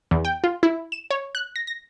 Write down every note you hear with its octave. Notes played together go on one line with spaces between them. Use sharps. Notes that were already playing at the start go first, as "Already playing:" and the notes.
E2
G5
F4
E4
E7
C#5
F#6
A#6
A#6